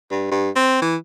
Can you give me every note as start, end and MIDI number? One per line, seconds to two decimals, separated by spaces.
0.11 0.28 43
0.31 0.50 43
0.55 0.80 60
0.82 0.96 52